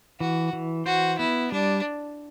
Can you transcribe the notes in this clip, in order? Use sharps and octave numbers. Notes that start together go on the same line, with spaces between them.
E3 F#4
E3
F#4 C5
B3 E4
G3 D4